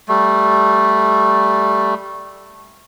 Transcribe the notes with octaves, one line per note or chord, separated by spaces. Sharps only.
G3 A3